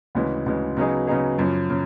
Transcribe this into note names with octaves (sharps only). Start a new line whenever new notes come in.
D2 C#3 E3 G#3
D2 C#3 E3 G#3
C#3 F#3 B3 D#4 G#4
C#3 F#3 B3 D#4 G#4
F#2 C#3 F3
C#3